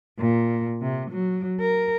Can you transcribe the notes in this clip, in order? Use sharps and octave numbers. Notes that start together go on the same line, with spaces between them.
A#2
C3
F#3
A#4